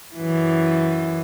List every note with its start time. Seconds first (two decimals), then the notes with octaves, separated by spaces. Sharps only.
0.16 F#2 E3